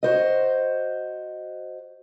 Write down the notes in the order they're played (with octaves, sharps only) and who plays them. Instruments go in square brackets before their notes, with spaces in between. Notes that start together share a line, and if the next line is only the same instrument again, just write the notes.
[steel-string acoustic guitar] F#4 C5 D#5